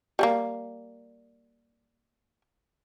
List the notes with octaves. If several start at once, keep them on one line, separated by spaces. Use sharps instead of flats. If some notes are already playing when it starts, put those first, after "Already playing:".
G3 G#3 A#3